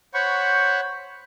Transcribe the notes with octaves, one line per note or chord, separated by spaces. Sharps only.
C5 C#5 F#5 B5 C#6